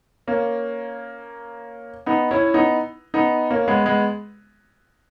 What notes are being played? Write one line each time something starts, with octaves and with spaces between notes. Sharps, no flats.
A#3 C#4
B3 D#4
C#4 E4
B3 D#4
B3 D#4
A#3 C#4
G#3 B3
G#3 B3